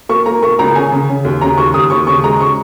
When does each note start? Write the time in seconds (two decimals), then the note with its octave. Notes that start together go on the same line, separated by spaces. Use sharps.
0.09 A#3 C#6
0.26 A#3 A#5
0.42 A#3 C#6
0.59 C#2 A#5
0.75 C#3 G#5
0.92 C#3
1.08 C#3
1.25 D#2
1.41 C#3 A#5
1.58 D#2 C#6
1.74 D#2 D#6
1.90 D#2 C#6
2.07 C#3 C#6
2.24 G#3 A#5
2.40 C#6